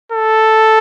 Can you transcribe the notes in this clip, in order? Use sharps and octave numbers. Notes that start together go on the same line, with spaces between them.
A4